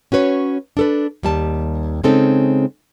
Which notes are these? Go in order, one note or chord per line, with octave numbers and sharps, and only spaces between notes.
C#4 F#4 B4 C#5
D4 A4 B4
D#2 G3 A5
C#3 G#3 C4 C#4 D#4 A4